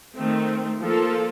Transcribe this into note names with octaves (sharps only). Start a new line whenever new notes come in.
D#3 A3 C4
F3 A#3 F4 A4